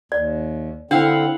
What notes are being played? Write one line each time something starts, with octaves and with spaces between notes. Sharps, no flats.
D#2 D5
D3 C4 D4 E4 F5 F#5